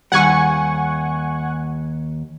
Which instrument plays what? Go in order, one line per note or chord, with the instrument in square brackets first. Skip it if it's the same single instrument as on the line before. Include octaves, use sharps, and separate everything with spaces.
[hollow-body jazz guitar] D#2 G3 [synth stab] F#5 G#5 C#6